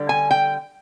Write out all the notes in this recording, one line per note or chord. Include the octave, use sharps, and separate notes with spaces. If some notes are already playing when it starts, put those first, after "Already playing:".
Already playing: D3 G3
G#5
G5